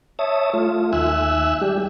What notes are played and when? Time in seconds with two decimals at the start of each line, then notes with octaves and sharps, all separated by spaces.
0.19 C#5 E5 A5 D#6
0.53 A3 F4
0.93 D#2 E5 G#5 E6 F#6
1.61 G3 G4